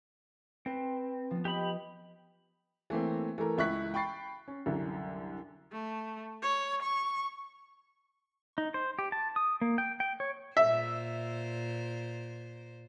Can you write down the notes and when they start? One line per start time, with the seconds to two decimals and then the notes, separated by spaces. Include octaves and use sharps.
0.66 C4 B4
1.31 F3 B3
1.45 G4 D#5 B5
2.90 E3 A3 A#3 C4
3.38 E3 A3 A4 A#4
3.58 C#2 E4 C#6 F#6 B6
3.94 G5 B5 C#6 A6 C7
4.48 C#4
4.66 C2 F#2 D3
5.72 A3
6.43 C#5
6.83 C#6
8.58 D#4
8.74 C5
8.99 G4
9.12 A5
9.36 D#6
9.61 A#3
9.78 G5
10.00 G5
10.20 C#5
10.57 A#2 C5 E5